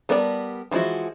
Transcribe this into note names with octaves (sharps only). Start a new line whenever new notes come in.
G3 B3 A#4 D5 A5
E3 F3 G#3 E4 F#4